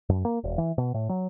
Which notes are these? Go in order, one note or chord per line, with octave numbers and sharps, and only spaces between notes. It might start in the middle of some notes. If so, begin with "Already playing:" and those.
F#2
A#3
E1
E3
B2
A2
F#3